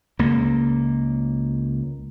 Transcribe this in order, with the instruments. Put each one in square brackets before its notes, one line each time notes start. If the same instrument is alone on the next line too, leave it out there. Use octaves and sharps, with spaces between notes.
[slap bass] C#2 A#3